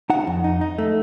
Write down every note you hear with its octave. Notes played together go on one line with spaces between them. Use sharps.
D#4 F#5
F2
D#4
D#4
A3